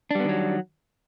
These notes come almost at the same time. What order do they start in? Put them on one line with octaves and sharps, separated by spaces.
D4 G3 B3 D#3 F#3